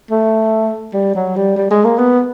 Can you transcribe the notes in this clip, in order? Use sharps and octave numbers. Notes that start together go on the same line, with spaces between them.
A3
G3
F#3
G3
G3
G#3
A#3
B3